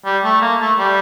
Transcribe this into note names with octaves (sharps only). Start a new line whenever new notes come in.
G3
A3
A#3
A3
G3